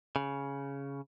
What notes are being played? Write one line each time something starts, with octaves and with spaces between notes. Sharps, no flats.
C#3